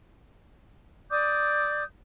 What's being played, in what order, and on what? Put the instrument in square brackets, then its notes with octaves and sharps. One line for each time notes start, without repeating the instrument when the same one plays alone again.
[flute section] D5 D6 D#6 G6